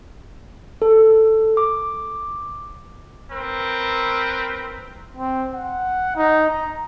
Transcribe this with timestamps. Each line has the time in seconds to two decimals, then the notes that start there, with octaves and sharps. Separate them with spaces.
0.82 A4
1.57 D6
3.31 C4 A#4 B4
5.17 C4
5.53 F#5
6.16 D#4
6.50 A#5